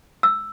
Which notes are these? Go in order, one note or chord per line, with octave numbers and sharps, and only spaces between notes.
E6